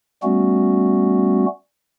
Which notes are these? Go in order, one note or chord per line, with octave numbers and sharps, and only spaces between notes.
G3 A3 B3 C#4 F#4